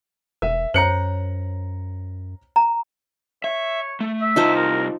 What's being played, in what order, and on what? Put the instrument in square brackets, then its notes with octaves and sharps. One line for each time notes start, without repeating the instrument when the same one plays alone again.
[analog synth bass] E1 [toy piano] A#4 [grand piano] E5
[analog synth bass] F#2 [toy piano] C5 C#5 [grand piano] A#5 C#7 F#7
[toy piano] A#5
[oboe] C#5 [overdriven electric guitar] E5
[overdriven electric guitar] A3
[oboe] E5
[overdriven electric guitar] C2 A5 [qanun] D#4 F4 C5
[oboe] A#4